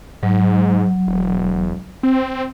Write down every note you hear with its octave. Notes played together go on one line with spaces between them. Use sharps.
G#2 F#3
E1
C4